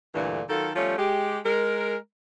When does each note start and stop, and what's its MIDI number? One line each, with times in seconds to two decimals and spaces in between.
0.15 0.42 38
0.15 0.42 43
0.15 0.42 46
0.15 0.42 50
0.15 0.42 52
0.50 0.71 51
0.50 0.71 54
0.50 0.71 65
0.50 0.71 69
0.76 0.95 53
0.76 0.95 55
0.76 0.95 57
0.76 0.95 61
0.76 0.95 65
0.98 1.39 56
0.98 1.39 67
1.45 1.97 56
1.45 1.97 70